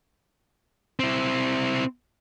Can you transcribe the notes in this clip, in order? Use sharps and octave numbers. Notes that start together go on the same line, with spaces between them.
C4 E4